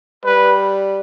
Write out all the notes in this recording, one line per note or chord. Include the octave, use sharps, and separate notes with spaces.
G3 B4